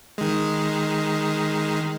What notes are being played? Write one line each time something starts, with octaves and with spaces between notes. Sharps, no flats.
D#3 G#3